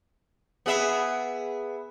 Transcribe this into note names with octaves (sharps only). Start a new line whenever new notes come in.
B3 G#4 E5